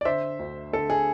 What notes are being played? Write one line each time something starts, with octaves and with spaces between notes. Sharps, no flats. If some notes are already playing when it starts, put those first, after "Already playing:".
D5
D3 C5 E5
D2
D3 A4
G#4